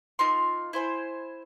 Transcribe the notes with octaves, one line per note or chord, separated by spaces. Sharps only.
D#4 F4 A#4 C6
E4 C5 G#5